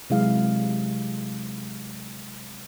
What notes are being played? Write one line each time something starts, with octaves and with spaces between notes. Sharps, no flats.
C3 F#3 G#3 E4 G#4 F5